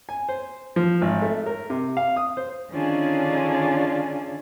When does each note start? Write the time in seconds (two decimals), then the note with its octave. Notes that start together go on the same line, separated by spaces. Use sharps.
0.09 G#5
0.29 C5
0.76 F3
1.01 G#1
1.22 A3
1.46 A#4
1.70 C3
1.97 F5
2.16 D#6
2.37 C5
2.71 D3 D#3 C#4 D4 F4 G#4